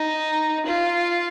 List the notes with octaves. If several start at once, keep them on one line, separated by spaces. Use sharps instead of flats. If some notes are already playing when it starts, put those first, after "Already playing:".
Already playing: D#4
F4